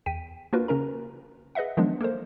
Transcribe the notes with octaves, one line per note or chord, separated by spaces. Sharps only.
E2 G5 B6 D#7
A#3 D4 F4 F#4 A#4 B4
C#3 C#4 A#4 A#5
G#4 B4 D#5 E5 F#5
D#3 F3 F#3 G#3 B3 D4
A#3 A4 A#4 C5